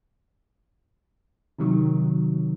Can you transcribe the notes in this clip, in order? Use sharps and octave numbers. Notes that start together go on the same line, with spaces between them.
C3 D#3 F#3